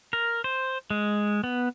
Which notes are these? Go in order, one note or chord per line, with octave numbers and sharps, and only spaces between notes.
A#4
C5
G#3
B3